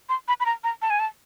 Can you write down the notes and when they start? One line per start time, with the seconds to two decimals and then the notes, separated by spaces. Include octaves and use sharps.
0.09 C6
0.28 B5
0.40 B5
0.46 A#5
0.64 A#5
0.82 A5
0.90 G#5
1.00 A5